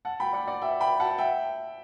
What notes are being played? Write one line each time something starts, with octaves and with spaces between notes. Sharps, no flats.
F#5 A5
G5 B5
D5 F#5
D5 F#5
E5 G5
G5 B5
F#5 A5
E5 G5